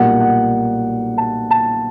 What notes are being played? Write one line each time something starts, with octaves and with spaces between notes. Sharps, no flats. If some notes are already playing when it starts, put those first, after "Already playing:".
Already playing: B1 A#2 G3 A#3 F#5
F#5
A5
A5